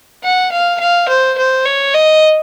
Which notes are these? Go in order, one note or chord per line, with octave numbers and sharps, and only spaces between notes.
F#5
F5
F5
C5
C5
C#5
D#5